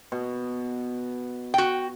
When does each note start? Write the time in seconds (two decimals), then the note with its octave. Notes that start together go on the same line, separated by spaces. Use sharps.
0.12 B2
1.54 F#4 G5